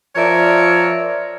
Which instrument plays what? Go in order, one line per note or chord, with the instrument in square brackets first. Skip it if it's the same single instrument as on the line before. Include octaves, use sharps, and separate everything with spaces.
[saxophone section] F3 A#4 C#5 D5 E5